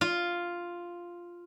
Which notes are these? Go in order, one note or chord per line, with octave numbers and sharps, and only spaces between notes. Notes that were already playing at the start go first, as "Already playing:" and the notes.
F4